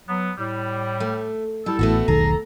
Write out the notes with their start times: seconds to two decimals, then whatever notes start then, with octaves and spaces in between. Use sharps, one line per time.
0.09 F#3 B3
0.38 A2 G3
1.00 A3
1.66 G3 E4 A4
1.79 A1 A3 B3 F#4
2.08 E1 B1 D#3 G#4 A4 A#5